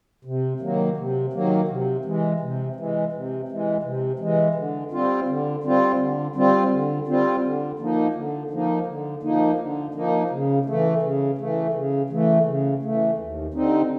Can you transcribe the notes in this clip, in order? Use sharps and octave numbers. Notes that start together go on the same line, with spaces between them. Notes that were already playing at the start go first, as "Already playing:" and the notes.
C3
D#3 F#3 A#3
C3
D#3 F#3 A#3
C3
E3 G#3
C3
E3 G#3
C3
E3 G#3
C3
E3 G#3
D3
G3 C4 F4
D3
G3 C4 F4
D3
G3 C4 F4
D3
G3 C4 F4
D3
F3 A#3 D#4
D3
F3 A#3 D#4
D3
F3 A#3 D#4
D3
F3 A#3 D#4
C#3
E3 A3
C#3
E3 A3
C#3
E3 A3
C#3
E3 A3
D#2
D3 G3 C4 D#4